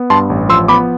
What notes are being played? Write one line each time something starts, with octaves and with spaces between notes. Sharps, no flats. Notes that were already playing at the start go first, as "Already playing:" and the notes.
Already playing: B3
G2 A5 C6
A1
F3 C6 E6
B3 B5 D6